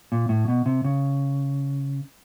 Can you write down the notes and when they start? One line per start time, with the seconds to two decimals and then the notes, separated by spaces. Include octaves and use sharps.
0.12 A#2
0.29 A2
0.48 B2
0.66 C3
0.84 C#3